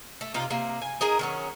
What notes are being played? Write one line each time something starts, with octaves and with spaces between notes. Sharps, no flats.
A3
C3 D#4 F4
C3 A#3
G#5
D#4 G#4 A#4 G#5
D#3 F#3 C#4